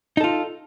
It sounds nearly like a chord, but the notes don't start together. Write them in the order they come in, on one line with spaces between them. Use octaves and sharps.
D#4 A4 F4